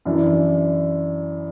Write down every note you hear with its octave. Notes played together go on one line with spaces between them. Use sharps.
F#2 E3 D4